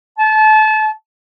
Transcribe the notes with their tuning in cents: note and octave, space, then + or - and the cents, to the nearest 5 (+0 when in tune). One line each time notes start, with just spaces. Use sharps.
A5 -30